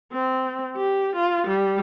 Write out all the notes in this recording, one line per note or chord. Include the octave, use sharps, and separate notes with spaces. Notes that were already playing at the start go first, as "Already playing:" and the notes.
C4
G4
F4
G3